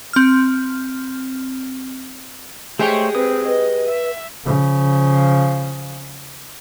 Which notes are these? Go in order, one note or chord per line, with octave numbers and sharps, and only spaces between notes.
C4 F6
G#3 A3 G4 G#4 C5 C#5 G5
C4 B4 D#6
B4 D#5
E5
C#3 F3